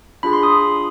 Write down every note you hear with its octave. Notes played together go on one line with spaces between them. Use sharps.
D4 F4 G#4 B5
C6
D#6